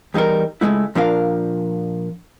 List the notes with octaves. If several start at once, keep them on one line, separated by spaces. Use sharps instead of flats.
E2 G3 D#4 A4 A#4
C#2 A#2 G#3 A3 E4
A#2 F3 D4 A#4 F5